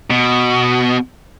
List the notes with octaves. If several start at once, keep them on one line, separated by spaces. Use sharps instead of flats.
B2